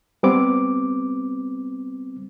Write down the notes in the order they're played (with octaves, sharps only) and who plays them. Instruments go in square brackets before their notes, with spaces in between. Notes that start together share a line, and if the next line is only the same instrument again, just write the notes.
[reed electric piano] G3 B3 C4 D6